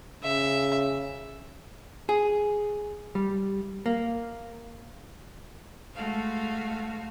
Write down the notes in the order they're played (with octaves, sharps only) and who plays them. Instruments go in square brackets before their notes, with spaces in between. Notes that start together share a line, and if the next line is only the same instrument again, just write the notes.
[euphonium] C#3 [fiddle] E5
[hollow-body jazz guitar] G#4
G3
A#3
[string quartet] G#3 A3 F#4 F5